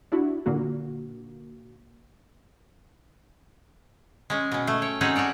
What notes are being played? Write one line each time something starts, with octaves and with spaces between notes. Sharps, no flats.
D4 E4 F#4
A#2 D3 A#3 F#4
G#3 C#4
B2 C#4
A3
C#5 G5
C4 C#4 D#4 F#4 G#4 C#5
F#4 A4 C#5 D5